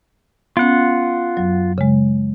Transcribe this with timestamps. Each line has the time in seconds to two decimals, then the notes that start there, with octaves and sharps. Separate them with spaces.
0.57 B3 C#4 F4 F#5
1.37 F#2 F#3
1.78 C#3 G#3